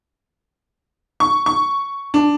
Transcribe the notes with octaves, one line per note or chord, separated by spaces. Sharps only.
C#6
C#6
D4